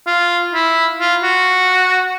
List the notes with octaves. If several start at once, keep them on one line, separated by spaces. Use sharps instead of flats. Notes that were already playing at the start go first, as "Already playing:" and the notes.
F4
E4
F4
F#4